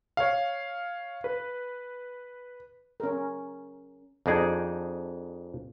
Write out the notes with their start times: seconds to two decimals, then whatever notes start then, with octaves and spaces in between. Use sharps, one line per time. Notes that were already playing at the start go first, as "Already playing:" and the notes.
0.17 C#5 F5
1.24 B4
3.00 C#4 A#4
4.26 F2 D4 D#4 G#4 G5